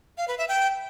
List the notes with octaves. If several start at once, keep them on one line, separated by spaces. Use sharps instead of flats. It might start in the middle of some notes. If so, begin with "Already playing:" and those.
F5
B4
E5
G5